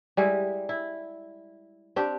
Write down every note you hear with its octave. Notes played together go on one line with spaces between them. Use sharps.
G3 G#3 E4
E4
C4 D4 G4